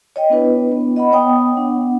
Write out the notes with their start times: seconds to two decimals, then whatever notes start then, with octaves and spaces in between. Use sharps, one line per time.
0.16 C#5 D#5 G5
0.30 B3 D4 E4 B4
0.72 B3
0.96 D#5 F#5 B5
1.12 B3 C#5 G5 D#6
1.57 B3 D4 F#5